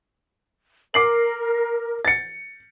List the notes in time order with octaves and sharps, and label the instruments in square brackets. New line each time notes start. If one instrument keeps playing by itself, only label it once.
[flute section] A#4 [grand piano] D6 C7 F#7
[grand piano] A6 C#7